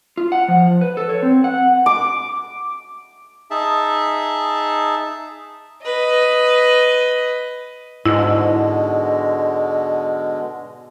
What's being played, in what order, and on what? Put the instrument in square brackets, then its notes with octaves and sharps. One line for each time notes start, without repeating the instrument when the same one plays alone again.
[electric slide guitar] F4
F#5
F3
B4
A4
C#5
C4
F#5
[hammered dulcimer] D6
[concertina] D#4 G#4 E5 A5
[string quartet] B4 D#5
[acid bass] G#2 [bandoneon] B2 D3 G#3 [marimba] E4